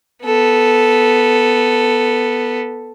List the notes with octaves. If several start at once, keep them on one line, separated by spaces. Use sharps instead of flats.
B3 A4